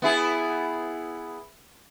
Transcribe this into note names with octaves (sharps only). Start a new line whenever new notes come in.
B3 E4 G#4